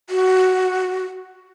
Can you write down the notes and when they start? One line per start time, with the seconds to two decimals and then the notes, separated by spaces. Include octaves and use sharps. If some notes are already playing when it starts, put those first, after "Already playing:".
0.10 F#4